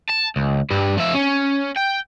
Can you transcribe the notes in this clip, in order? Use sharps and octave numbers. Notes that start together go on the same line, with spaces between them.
A5
C#2
G2 G3
F3 E5
C#4
G5